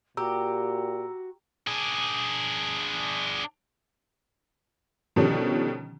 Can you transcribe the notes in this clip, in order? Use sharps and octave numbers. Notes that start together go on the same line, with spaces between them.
A#2 F#4 G4 A#5 E6
D4 G#4
B2 D3 D#3 F3 G3 C#4